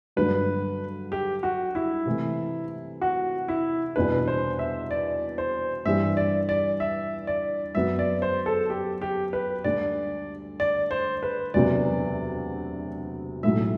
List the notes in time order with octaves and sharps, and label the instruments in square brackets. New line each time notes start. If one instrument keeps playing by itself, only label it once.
[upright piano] G2 D3 F#3 [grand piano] B4
[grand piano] G4
F#4
E4
[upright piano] C3 E3 A3
[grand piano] F#4
E4
[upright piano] E2 B2 G3 D4 [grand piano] B4
[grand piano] C5
E5
D5
C5
[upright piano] G2 E3 G3 [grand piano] E5
[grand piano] D5
D5
E5
D5
[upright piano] F#2 F#3 B3 F#4 [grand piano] E5
[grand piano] D5
C5
A4
G4
G4
B4
[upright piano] D2 D3 G3 [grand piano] D5
[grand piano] D5
C5
B4
[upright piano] E1 D2 C3 F#3 B3 [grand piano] D5
[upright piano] B1 A2 F#3 [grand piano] E5